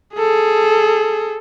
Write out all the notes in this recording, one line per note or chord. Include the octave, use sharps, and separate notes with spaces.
G#4 A4